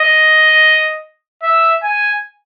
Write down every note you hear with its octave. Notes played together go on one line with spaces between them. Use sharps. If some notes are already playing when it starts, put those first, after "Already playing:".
Already playing: D#5
E5
G#5